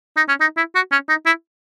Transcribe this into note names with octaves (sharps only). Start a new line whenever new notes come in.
D#4
C#4
D#4
E4
F#4
C#4
D#4
E4